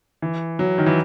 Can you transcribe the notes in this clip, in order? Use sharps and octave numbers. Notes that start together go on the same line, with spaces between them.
E3
F#3
D#3
E3